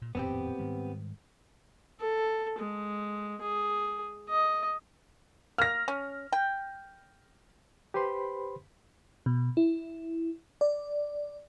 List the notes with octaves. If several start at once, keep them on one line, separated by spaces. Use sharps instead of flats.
A#2
D#1 F2 A2 B3 C4 G4
G#2 D#3 G3
A4
G#3
G#4
D#5
A#3 F6 A#6
C#4
G5
G4 B4 C5 B5 C6
B2
E4
D5